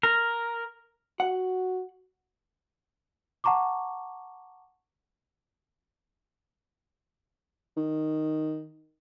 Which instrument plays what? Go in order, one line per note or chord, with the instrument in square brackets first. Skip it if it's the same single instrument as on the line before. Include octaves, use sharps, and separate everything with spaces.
[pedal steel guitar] A#4
[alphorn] F#4 [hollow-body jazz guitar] F#5
[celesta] F#5 A5 A#5 C#6 D6
[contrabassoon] D#3